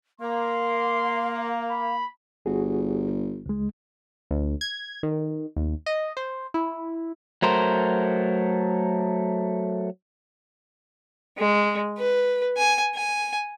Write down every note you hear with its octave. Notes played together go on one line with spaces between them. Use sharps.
A#3 F5 C6
B5
G1 F#4 G#4
C#2 G#3
D2
G#6
D#3
D#2
D#5
C5
E4
F#3 A3 A#4 C5
G#3
B4
G#5
G#5